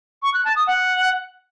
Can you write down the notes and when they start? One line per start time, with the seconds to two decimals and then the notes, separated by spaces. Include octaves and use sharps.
0.23 C#6
0.34 F#6
0.45 A5
0.56 D#6
0.67 F#5